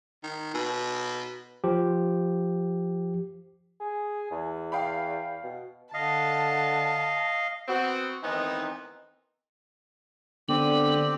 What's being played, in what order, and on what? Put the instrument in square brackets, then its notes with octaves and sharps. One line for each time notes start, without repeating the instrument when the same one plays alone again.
[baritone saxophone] D#3
B2
[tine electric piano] F3 G4
[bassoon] G#4
E2
[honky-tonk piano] F5 G5 B5
[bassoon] B2
[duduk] D3 [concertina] D#5 F5 [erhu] A5
[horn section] B3 C4 F#4
D#3 E3 G#3 B3 C4 D#4
[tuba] D3 [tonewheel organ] B3 [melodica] C4 G4